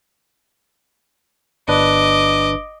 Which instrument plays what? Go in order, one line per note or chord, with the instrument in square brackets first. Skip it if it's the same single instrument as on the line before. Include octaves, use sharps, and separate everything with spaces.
[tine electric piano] G1 D4 B4 [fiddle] D#5 D6